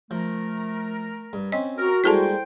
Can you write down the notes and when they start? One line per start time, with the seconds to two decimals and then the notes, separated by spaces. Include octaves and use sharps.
0.11 F3 A3 A#4
1.33 G2
1.52 C4 C#4 D#5
1.78 F#4 A#4
2.04 G3 G#3 A#3 E4 A4 C5 G5 A5